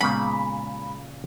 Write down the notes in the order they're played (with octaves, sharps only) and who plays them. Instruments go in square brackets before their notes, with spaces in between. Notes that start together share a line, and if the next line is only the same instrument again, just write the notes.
[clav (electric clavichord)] A#2 C#3 F3 [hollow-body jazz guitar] G#3 B3 F#5 [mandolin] B5